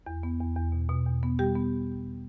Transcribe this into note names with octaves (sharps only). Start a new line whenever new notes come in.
E2
B3
E2
E2
B2
B2
E2
B3
G3 G4 G5
B3